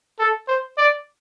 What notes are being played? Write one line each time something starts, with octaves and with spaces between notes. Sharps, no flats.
A4
C5
D5